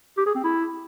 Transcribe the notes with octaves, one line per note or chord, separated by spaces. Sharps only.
G4
G#4
C4
E4